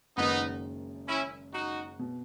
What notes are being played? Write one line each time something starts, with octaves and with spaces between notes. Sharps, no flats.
F#1 F#2 D#3 G#3 B3 D#4
C#4 E4
D#4 F#4
B2